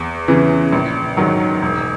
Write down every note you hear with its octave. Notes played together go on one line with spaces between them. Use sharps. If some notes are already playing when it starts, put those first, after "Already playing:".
Already playing: E2
C#3 E3
A#1
G#2 D#3 F#3
E1